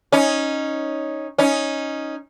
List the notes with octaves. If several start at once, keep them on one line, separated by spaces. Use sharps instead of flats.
C#4 D#4
C#4 D#4